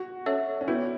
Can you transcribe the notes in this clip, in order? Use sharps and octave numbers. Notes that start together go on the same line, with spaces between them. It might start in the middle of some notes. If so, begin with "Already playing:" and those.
Already playing: F#4
C#4 A4 C#5 E5
C#4
B3 E4 F#4 B4